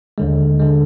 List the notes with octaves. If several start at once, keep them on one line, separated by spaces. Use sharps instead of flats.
D#2 D3 G#3
D3 G#3